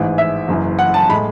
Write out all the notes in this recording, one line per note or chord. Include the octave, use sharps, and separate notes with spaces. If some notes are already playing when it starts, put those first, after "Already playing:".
Already playing: A1 G#2 E3
E5
F#1 F#2 E3
F#5
A5
A2 G#3 B5